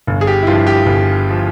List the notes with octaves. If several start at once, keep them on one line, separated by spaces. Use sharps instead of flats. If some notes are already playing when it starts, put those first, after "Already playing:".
G1
G#4
G4
E4
G2 F3 F4
G4
G1
F3